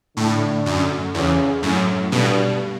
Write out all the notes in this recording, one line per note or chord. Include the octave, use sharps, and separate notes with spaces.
A2 D3
F#2
E2 C#3
F#2 A2
G2 B2